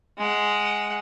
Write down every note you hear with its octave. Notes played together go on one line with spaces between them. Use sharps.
G#3 F#5